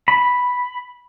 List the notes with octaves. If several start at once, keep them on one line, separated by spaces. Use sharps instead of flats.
B5